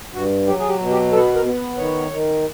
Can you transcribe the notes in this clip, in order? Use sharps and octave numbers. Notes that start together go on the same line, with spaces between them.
G2 F#4
F#3 G4
G#4
G4
B2
G4
B3 A4
A#4
B3
D#3 C#5
D#3